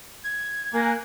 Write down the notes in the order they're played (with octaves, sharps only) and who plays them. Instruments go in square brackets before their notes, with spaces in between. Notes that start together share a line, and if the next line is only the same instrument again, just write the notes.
[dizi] G#6
[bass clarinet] A#3 [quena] A#4 [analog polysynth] G#5 F#6